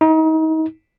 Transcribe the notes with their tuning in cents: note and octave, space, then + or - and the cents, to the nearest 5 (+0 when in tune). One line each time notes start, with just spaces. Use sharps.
D#4 +35